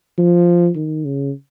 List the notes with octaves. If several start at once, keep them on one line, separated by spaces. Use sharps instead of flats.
F3
D#3
C#3